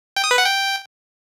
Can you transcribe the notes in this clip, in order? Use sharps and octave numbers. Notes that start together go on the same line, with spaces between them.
G5
D#6
B4
F#5
G5